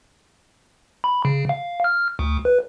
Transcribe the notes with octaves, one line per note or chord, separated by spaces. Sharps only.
B5
C#3
F5
F6
D2
B4